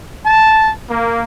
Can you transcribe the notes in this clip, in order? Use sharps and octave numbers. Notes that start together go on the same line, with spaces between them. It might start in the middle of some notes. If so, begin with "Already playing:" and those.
A5
A#3